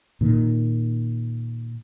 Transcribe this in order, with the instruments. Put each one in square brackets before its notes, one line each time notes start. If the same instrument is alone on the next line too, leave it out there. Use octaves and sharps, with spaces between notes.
[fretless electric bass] A#2 D#3